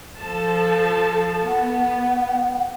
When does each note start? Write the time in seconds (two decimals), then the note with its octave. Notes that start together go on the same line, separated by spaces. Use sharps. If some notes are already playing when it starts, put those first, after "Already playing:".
0.18 F3 A4 A5
1.47 B3 F#5